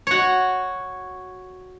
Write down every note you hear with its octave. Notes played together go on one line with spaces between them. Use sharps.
F#4 C#5